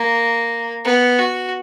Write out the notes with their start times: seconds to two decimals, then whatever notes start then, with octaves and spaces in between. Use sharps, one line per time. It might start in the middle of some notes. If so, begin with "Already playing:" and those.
Already playing: A#3
0.85 B3
1.18 F#4